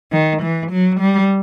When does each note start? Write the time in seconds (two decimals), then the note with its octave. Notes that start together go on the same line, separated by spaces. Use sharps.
0.12 D#3
0.42 E3
0.72 F#3
1.00 G3